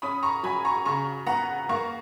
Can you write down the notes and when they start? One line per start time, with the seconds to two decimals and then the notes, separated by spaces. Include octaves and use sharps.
0.02 C#4 B5 D#6
0.23 A#5 C#6
0.43 F#3 G#5 B5
0.65 A#5 C#6
0.85 C#3 A#5 C#6
1.27 B3 F#5 A#5
1.69 A#3 A#5 C#6